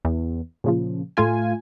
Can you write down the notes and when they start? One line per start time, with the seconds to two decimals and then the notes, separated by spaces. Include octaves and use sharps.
0.05 E2
0.64 A#2 C#3 F3
1.17 A2 A3 F4 G#5